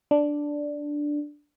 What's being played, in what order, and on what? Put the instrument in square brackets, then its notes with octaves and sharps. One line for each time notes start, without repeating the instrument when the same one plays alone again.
[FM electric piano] D4